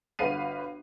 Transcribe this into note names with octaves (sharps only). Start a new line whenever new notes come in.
G1 F#4 B4 F5 C7 D#7